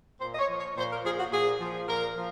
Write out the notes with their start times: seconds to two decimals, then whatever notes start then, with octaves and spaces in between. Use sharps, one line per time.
0.20 A#2 C5
0.33 D#5
0.39 C#5
0.49 F3
0.58 C#5
0.76 A#2 C5
0.90 A#4
1.03 F3 G#4
1.18 F#4
1.31 A#2 G#4
1.59 F3
1.87 A#2 A#4
2.15 F3